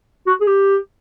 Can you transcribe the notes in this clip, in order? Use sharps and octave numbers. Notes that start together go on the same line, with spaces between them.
F#4
G#4
G4